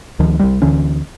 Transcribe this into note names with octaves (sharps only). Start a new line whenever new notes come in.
D2 D#3 F3
C2 G3
D2 D3 E3 C#4